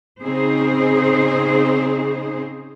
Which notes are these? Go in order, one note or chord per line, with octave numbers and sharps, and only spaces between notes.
C#3 C4 D#4 G#4 C5